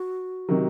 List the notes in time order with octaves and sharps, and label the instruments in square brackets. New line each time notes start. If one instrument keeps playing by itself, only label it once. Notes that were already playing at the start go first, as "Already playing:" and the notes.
Already playing: [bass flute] F#4
[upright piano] C3 D#3 F#3